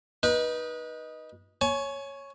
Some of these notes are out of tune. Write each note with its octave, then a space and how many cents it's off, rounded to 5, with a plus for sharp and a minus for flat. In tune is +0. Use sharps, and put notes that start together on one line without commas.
D#4 +0 B4 -25
C#5 +0 G#5 +30